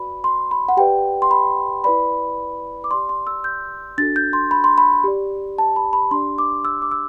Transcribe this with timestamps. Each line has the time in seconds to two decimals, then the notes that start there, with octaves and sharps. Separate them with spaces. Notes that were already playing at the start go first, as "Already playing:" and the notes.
Already playing: F#4 B4 D5 B5
0.24 C6
0.51 B5
0.69 F#5
0.77 G4 B4 D5 G5
1.22 C6
1.31 B5
1.84 E4 B4 D5 B5
2.84 D6
2.91 G4 D5 C6
3.09 C6
3.27 E6
3.44 G6
3.98 D4 F#4 A4 A6
4.16 G6
4.33 C6
4.51 B5
4.64 C6
4.78 B5
5.04 G4 D5
5.58 A5
5.76 B5
5.93 B5
6.11 D4 G4 D5 C6
6.38 D6
6.65 E6
6.82 D6
6.91 E6